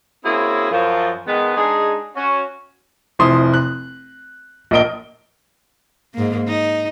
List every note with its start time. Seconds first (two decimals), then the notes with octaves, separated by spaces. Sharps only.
0.24 A#3 C4 C#4 E4 F#4 G#4
0.72 F#2 F3
1.27 D#3 G#3 B3
1.57 G#3 D4 D#4 G#4
2.17 C#4 F#4
3.19 F1 F3 E4 C6 D#6
3.54 F#6
4.71 A#1 A#3 D#5 D7 G7
6.14 G#2 A#3
6.48 D#4